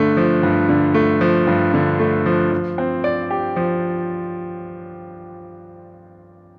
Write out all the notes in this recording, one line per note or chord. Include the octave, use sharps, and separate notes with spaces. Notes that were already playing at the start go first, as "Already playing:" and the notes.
Already playing: G2 D3 A3
F3
G2
D3
A3
F3
G2
D3
A3
F3
F3
C4
D5
G4
F3